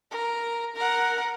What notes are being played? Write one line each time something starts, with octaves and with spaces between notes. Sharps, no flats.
A#4
A#4 F#5